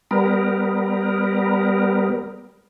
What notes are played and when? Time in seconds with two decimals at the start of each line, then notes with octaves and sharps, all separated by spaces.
0.11 G3 B3 A#4